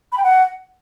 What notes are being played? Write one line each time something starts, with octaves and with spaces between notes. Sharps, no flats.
B5
G5
F#5